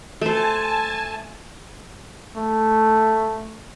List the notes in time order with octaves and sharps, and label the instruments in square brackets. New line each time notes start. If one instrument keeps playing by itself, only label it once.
[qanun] A3 C5 [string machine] G#5 A5
[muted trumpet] A3